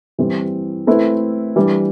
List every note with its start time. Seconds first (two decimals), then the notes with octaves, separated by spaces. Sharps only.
0.18 E3 G3 C4
0.87 A3 C4 E4 B4
1.56 E3 G3 D4